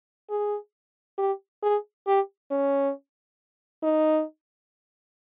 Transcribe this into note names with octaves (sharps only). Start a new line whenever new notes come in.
G#4
G4
G#4
G4
C#4
D#4